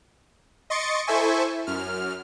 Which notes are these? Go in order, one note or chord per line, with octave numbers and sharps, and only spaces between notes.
D#5 C6 C#6 A6 C#7 D7
E4 A4 C5 E5 G#5 C#6
F#2 F6